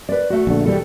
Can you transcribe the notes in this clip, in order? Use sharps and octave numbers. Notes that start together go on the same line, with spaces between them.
B4 D5
A3 F#4
A#1 D3
E2 B2 G3 A4